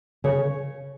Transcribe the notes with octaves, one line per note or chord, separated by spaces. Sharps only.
C#3 C#5